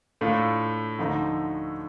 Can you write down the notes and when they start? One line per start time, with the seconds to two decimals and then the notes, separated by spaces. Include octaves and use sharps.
0.21 A2 A3 D4 F4
0.98 D2 D3 F3 A3 D#4